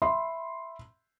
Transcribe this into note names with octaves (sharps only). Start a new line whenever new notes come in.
E5 B5 C6